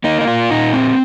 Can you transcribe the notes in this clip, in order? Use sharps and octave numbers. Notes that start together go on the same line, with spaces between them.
A#3 D#4
D#4
F4
A#2 D#4
C4